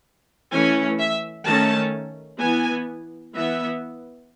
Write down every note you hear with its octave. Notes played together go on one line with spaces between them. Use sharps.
E3 A3 C#4 G#5
E5
D#3 A3 C#4 A5
E3 B3 G#5
E3 B3 E5